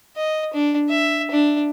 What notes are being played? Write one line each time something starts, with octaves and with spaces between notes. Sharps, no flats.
D#5
D4
E5
D4